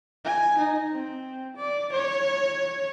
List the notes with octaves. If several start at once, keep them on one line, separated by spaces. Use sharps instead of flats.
G#5
D#4
C4
D5
C#5